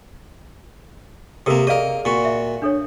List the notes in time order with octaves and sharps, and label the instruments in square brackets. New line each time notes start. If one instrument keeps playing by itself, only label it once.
[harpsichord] C3 A#3 [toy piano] A4 A#4
[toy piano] G#4 D5 F5 [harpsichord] A#4 D#5
[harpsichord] A#2 F#4
[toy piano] E5
D4 A4 C#5